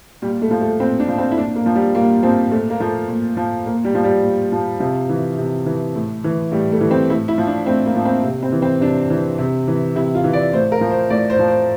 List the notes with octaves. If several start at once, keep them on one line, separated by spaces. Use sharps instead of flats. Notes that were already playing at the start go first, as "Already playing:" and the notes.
A#2 G3
A3
F3
A3
A#2 C4
D4
F3
C4
E4
A#2 D4
A#3
F3
G3
A#2 A#3
F3 C4
A#2 A3
A#3
F3 A3
A#2
F3
A#2 A#3
G3
F3
G3
A#2
F3
C3 F3
E3
C3
E3
A2
E3
A2 G3
A3
E3
C4
A2 E4
E4
F3
D4
A2 C4
A#3
F3
C4
C3
C4
E3
C4
C3 D4
E3
C3
E3
C3 E4
F4
E3
D5
A2 C5
A#4
F3
C5
A2 D5
C5
F3
C5